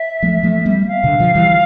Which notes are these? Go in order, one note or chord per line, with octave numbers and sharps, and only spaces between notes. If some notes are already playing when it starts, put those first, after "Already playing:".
Already playing: E5
F3 A3
F3 A3
G3 B3
F5
B2 D3
D3 F3
E3 G3